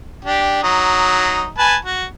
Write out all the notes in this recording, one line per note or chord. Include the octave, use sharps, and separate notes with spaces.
D4 G4
F#3 D#4
B4 G#5 A5
F#4